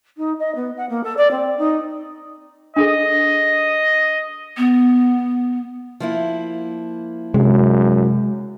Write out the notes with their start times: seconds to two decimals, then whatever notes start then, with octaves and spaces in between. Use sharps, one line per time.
0.17 D#4
0.39 D#5
0.55 B3
0.77 F#5
0.89 A#3
1.03 A4
1.17 D5
1.30 C4
1.58 D#4
2.76 D4 G#4 A4 D#5
4.57 B3
6.00 F3 A#3 E4
7.34 F#2 C3 G#3